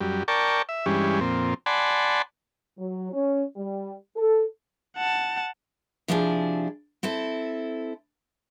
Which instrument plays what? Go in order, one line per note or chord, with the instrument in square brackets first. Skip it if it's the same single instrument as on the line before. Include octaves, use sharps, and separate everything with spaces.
[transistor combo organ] F#2 G3
A#4 D5 G5 A5 C#6
E5
G2 E3 G3 G#3 C#4
F2 A#2 C4
D5 F#5 G#5 A5 B5 C6
[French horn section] F#3
C#4
G3
A4
[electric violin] F#5 A5
[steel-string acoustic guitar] C3 F3 D4 E4 G4 G#4
C4 E4 A4